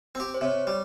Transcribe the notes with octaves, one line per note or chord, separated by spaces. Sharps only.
C4 G4
C5
C3 C#5
G3